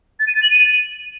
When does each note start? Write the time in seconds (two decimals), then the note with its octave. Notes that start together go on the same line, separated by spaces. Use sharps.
0.20 A6
0.27 D#7
0.35 A6
0.43 F#7
0.51 D#7